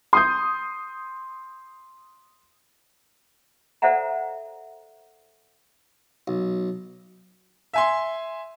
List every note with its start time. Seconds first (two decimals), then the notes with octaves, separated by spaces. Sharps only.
0.13 C6 D#6 G6
3.82 A4 C5 D5 E5 F#5 A#5
6.28 B1
7.73 E5 G#5 C6